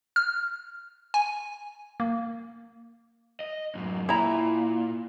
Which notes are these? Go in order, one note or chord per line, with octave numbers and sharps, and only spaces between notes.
F6
G#5
A#3
D#5
F#2 A2
A#2 E4 A#5